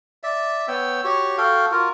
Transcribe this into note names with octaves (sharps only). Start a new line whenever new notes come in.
D5 E5
B3 C#5 G5 E6
F#4 G4 C#5
F#4 A4 F5 G5
F4 F#4 A#4